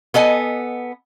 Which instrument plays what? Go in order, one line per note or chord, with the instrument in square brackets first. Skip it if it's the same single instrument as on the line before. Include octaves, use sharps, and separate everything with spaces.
[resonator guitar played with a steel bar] B3 A4 D#5 G#5